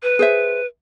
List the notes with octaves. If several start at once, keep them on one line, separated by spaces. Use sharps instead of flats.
B4
G#4 C5 E5